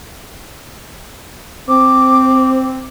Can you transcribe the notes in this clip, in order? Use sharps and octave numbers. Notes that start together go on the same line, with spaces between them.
C4 D6